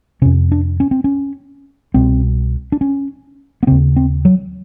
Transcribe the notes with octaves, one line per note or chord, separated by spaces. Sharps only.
F2 C3 C#4
D4
C#4
C4
C#4
C2 B2 C4
D4
C#4
B3
D#2 C#3 C4
C4
F#3